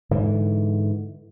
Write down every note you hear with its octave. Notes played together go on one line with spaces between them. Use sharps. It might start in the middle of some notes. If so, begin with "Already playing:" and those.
G#2 D3 E3